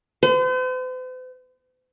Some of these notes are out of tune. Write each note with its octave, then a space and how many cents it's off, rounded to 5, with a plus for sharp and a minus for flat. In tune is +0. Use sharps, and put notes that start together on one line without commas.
C5 -45